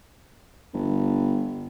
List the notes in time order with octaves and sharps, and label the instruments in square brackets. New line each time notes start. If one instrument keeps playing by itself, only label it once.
[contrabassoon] G1